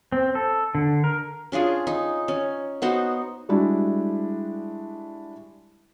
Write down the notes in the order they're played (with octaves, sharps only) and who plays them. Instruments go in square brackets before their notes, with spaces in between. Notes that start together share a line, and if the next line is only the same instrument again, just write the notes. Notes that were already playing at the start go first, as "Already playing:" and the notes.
[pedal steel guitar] C4
A4
D3
A#4
[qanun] C#4 D4 F4 G#4
D#4
C#4
B3 D#4 F#4 C5
[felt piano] G3 G#3 D4 E4 F#4